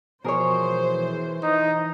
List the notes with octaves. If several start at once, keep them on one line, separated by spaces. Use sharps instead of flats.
B2 E3 F3 G#4 A#4 C5 C#5
E3 D#4 D#5 D#6